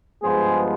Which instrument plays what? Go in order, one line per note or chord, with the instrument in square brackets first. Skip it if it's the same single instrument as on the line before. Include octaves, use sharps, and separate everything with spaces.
[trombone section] G2 F3 G#3 B3 G#4 C5